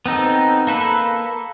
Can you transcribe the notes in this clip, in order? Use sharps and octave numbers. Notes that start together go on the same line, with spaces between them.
B3 C4 D#4 A4
A#3 A4 B4